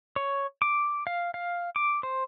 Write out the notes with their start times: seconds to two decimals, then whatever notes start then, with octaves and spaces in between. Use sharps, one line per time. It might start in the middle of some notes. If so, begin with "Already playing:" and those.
0.16 C#5
0.62 D6
1.07 F5
1.34 F5
1.76 D6
2.03 C5